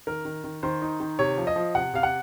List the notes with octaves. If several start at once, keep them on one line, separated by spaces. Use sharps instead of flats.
D#3 A#4
D#3
D#3
D#3 C5
D#4
D#3
C3 C#5
F3
D#5
F3
C3 F#5
C3 F5
F#5